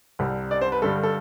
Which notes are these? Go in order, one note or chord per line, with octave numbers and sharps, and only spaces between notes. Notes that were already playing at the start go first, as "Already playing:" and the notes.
C2 C3 G3
D5
C5
B4
G2 D3 G3 A4
A4